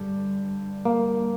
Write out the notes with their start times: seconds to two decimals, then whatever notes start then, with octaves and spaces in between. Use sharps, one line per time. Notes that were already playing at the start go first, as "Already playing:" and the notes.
Already playing: G2 D3 G3
0.85 A#3